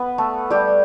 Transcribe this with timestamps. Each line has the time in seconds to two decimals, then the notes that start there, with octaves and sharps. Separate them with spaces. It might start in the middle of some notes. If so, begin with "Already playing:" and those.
Already playing: B3 B4
0.18 A3 A4
0.50 G3 G4